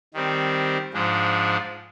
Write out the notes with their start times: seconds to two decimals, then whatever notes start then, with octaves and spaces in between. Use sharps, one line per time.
0.14 D#3 G3 C4
0.94 G#2 F3 G#3 D4